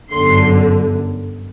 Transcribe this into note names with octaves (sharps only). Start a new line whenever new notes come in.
G1 F#2 D3 C6